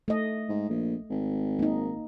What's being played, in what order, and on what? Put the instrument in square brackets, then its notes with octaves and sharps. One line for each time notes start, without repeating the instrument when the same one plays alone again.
[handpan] A3 D#5
[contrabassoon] G#2
A#1
G#1
[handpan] A#3 D#4